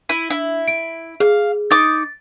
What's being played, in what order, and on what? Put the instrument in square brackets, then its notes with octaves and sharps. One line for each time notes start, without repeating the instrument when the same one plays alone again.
[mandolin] E4 [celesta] D#7
[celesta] D4 [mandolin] E4
[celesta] D7
[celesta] G#4 [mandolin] F5
[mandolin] D#4 D6 [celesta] A6